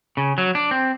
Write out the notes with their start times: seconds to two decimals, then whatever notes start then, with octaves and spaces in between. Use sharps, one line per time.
0.17 C#3
0.38 F#3
0.55 D4
0.71 C4